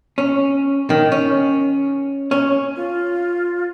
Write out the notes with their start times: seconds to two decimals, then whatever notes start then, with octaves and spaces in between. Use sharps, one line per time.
0.18 C#4
0.90 D#3
1.12 C#4
2.31 C#4
2.76 F4